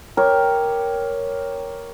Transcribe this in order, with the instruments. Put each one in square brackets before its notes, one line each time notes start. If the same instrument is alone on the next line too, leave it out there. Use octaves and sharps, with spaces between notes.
[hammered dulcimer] G4 A#4 C#5